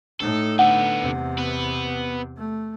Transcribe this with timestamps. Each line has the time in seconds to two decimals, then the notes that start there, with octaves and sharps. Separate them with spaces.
0.20 A2 D#4 A4
0.59 D3 B3 F#5
0.99 E2 C3
1.38 B3 B4
2.37 A3